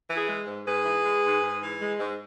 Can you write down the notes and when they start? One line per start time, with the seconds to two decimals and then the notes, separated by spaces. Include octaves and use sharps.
0.10 E3
0.16 E4 G#4
0.28 G#3
0.47 G#2
0.66 G#2 G#4 B4
0.85 E3
1.04 G#3
1.24 G#2
1.43 G#2
1.61 E3
1.80 G#3
2.00 G#2